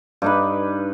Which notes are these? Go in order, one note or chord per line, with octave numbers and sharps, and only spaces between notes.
G2 D#4 B4